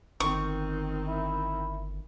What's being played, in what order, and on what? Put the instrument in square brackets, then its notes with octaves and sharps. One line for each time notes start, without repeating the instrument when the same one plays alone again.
[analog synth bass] G1 [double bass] D#3 C4 [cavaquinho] C#6
[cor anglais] E4